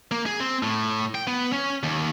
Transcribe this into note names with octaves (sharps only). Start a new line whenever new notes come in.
A#3
G#4
C4
A2
G5
B3
C#4
D#2